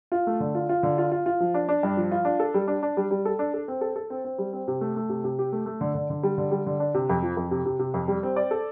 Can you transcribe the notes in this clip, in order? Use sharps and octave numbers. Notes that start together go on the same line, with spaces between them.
F4
A3
D3
F4
F4
D3
F4
F4
F4
F3
D4
D4
G2
F3
F4
D4
A4
G3
D4
D4
G3
G3
A4
D4
A4
C4
A4
A4
C4
C4
G3
C4
C3
A3
A3
C3
C3
G4
A3
A3
D3
D3
D3
G3
D3
G3
D3
D4
C3
F2
F3
F2
C3
C3
C3
F2
G3
C4
D5
A4